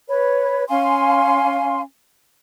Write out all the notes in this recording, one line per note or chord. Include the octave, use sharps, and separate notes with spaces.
B4 C#5
C#4 F5 G#5 C6